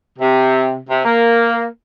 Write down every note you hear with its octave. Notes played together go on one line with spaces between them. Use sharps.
C3
C3
A#3